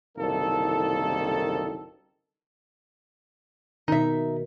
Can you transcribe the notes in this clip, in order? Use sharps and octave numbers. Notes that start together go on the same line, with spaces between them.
F#1 C2 D#3 A#3 A4
B2 D#3 D#4 E5